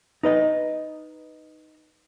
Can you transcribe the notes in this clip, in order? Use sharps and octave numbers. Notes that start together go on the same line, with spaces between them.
D#4 B4 D#5